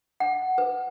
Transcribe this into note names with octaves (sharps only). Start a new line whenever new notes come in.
F#5
B4